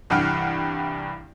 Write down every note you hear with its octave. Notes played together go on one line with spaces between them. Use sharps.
C2 G2 E3 F#5 G5 F6